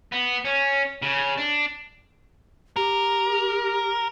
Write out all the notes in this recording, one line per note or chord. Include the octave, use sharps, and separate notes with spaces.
B3
C#4
C#3
D4
G4 A#4